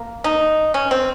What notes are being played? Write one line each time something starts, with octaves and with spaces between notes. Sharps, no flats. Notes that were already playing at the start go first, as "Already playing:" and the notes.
Already playing: A#3
D#4
C#4
C4